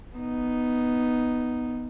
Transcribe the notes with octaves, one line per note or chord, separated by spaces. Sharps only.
B3 D#4